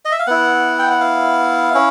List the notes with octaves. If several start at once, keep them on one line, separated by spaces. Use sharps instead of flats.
D#5
E5
F5
B3 E4 F#5
G5
F#5
F5
C#4 E4